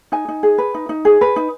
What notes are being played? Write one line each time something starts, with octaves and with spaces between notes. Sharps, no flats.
D#4 G#5
D#4
G#4
B4
D#4
D#4
G#4
B4
D#4